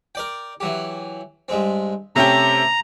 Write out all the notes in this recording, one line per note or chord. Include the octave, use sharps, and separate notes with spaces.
A#4 D5 G5
E3 F#3 G4
G2 G#3 C4
C3 A3 C#4 G4 A4 A5 A#5